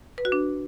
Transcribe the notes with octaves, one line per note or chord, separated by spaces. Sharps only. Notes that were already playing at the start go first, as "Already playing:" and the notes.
B4
F#4
D4